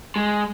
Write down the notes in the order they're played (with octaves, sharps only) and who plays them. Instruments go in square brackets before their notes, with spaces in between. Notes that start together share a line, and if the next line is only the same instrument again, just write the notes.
[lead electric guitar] G#3